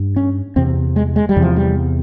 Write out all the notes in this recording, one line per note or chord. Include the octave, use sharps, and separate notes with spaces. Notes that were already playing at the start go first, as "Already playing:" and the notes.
Already playing: G2
C#4
E2 C3 C4
G#3
G#3
G3
E2 C3
F3
G3